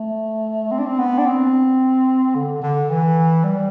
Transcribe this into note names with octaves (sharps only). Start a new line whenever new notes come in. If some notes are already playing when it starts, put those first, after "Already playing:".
Already playing: A3
C4
D4
C4
B3
D4
C4
D3
D3
E3
G3